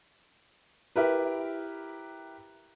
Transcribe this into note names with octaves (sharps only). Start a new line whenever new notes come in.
E4 G4 A#4 B4